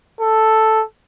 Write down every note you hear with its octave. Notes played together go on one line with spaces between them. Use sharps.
A4